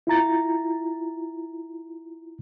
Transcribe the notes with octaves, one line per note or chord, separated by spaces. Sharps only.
E4 F4 A#5 A6